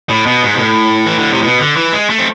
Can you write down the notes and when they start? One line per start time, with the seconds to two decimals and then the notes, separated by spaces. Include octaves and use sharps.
0.09 A2
0.26 B2
0.43 G#2
0.55 B2
0.59 A2
1.06 E3
1.19 D3
1.31 C3
1.42 B2
1.60 D3
1.76 E3
1.93 G#3
2.10 A3
2.19 C4